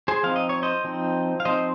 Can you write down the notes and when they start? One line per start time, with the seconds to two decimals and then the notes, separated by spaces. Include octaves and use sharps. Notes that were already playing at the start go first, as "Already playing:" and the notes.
0.08 G#4 C5
0.23 F3 C4 D#4 F5
0.36 D#5
0.49 C#5
0.63 C5 D#5
0.84 F3 C4 D#4
1.40 F5
1.45 F3 C4 D#4 C5 D#5